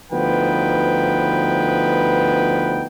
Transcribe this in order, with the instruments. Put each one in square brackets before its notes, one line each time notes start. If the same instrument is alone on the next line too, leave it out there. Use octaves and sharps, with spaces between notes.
[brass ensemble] D2 F3 B3 D#4 B4 G5